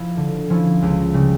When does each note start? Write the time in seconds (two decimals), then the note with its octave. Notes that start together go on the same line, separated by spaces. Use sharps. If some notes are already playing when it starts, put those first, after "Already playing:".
Already playing: F3 E4
0.17 D3
0.50 F3 C#4 E4
0.82 C#2
1.14 C#3 G3